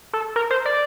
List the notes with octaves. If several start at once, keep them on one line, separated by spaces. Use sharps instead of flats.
A4
A#4
C5
D5